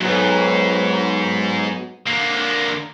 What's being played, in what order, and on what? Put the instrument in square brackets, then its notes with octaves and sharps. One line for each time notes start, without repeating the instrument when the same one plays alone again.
[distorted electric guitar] E2 G#2 [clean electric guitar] F#3 B3
[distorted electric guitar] D3 A#3